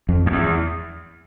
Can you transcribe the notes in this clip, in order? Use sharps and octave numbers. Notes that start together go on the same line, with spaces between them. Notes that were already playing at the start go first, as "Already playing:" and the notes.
F2
F2
E2